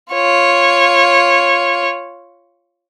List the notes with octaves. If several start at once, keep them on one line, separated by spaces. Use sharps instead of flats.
F4 C#5